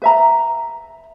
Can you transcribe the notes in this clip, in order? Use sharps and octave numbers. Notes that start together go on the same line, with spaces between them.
B4 E5 A#5